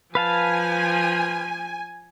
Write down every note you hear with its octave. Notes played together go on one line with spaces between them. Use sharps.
F3 B4 F5 G#5 A5